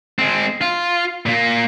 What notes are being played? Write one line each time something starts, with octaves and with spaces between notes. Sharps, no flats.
G#3 C4
F4
A#2 A#3